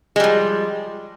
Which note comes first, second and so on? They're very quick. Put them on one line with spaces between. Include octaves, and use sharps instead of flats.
G#3 G3 F3